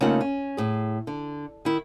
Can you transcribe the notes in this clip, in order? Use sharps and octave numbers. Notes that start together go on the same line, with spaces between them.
C#3 A3 A#3 D#4 F4 F#5
C#4
A2 G#4
D3
D#3 E4